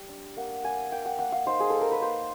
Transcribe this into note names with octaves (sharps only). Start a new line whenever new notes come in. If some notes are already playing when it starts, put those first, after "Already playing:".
Already playing: G3
D4
A#3 F#5
A#3 G#5
A#3 G5
F#5
A#3 F#5
F5
D#4 C5
G#4
A#3 A4
A#4
B4
A#3 C5